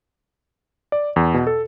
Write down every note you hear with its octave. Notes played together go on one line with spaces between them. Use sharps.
D5
E2
B2
A4